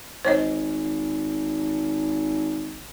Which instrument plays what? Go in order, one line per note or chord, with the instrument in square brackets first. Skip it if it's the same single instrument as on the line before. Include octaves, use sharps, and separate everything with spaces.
[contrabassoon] G#1 [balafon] C5 C#5 D#5